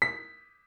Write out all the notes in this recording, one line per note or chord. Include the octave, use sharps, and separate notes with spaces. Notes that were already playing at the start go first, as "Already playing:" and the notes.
B6